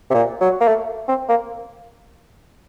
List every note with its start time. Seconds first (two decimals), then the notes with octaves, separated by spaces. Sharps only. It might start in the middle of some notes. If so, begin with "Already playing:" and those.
0.10 C3
0.14 A#2
0.41 F#3
0.61 A#3
0.68 A3
1.09 C4
1.29 A#3